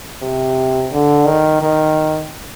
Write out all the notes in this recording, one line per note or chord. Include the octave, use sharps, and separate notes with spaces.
C3
D3
D#3
D#3